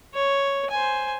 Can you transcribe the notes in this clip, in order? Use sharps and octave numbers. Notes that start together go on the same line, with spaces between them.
C#5
C5 G#5